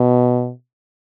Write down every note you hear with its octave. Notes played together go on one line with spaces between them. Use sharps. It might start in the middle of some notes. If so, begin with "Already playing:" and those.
Already playing: B2